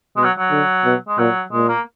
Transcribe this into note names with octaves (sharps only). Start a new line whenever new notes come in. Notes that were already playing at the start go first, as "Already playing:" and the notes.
B2 G#3
F#3
F#3
D3
B2
G#3
A#2 F#3
A#2 G#3
A#3